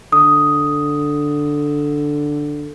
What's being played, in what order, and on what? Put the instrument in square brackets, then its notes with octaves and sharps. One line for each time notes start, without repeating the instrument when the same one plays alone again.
[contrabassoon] D3 [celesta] D#6